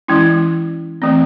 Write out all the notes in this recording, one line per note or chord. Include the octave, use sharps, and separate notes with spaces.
E3 G#3 C#4 E4
E3 A3 C4